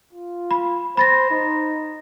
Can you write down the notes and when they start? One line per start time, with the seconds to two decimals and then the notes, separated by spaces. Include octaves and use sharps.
0.13 F4
0.51 B5
0.97 C5 B5 A6 A#6
1.31 D#4